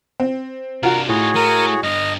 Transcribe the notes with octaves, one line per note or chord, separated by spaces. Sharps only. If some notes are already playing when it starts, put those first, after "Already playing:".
C4
C3 D4 F4 F#4 A#4 A#5
A2 D#4 F4 F#4 G#4 C#5
A3 A#4 G#5
G2 D3 D#5 F6